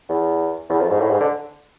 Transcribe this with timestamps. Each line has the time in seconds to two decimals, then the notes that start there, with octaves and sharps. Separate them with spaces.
0.09 E2
0.70 E2
0.80 F2
0.90 G#2
1.00 A2
1.11 G#2
1.20 D3